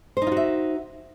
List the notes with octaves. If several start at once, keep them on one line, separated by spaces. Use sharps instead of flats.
D#4 F4 F#4 C5 E5